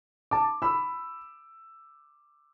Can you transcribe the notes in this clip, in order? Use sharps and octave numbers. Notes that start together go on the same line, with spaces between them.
A5 D6
B5 E6